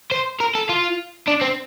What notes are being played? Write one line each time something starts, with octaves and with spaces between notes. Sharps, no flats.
C5
A#4
A4
F4
D4
C4